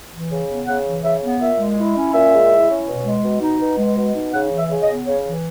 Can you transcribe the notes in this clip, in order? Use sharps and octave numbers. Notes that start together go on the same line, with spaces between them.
E3
C#3
B3
C#3 F#5
E3
C#3 E5
B3
A#2 E5
G#3
E4
C#4
A#2 E5
G#3
E4
C#4
B2
G#3
B2
D#4
B2
G#3
B2
D#4
C#3 F#5
E3
E5
C#3
D#5
B3
C#3 C#5
E3